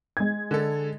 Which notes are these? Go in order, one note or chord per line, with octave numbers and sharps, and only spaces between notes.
G#3 G#6
D3 A4